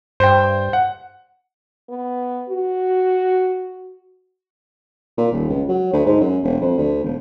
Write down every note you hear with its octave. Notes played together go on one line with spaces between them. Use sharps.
G2 C5 G5
F#5
B3
F#4
A#2
D#1
C#2
F#3
D2
G#2
F#2
E1
F2
D2
E1